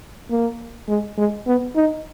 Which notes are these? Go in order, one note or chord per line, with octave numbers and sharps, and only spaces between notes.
A#3
G#3
G#3
B3
D#4